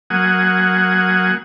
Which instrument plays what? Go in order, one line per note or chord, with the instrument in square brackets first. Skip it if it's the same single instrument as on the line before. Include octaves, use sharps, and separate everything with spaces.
[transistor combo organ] F#3 A#3 F#5 G#5 D#6